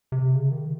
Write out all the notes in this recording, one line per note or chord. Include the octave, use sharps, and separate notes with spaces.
C3
C#3
D#3